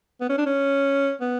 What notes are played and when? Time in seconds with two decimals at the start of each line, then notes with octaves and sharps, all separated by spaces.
0.21 B3
0.30 C#4
0.38 D4
0.46 C#4
1.21 B3